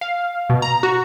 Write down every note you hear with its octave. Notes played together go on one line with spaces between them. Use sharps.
F5
B2
A#5
F#4